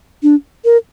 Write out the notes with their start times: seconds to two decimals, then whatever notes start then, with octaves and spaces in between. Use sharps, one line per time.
0.23 D4
0.65 A#4